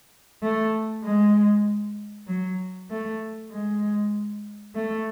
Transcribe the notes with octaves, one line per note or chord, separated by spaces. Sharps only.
A3
G#3
F#3
A3
G#3
A3